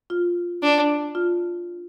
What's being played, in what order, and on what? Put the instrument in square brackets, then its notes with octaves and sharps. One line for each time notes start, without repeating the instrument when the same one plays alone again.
[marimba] F4
[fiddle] D4
[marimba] F4